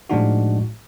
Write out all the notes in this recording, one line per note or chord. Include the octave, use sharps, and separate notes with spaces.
A2 F3 G#3 D4 D#4 F#4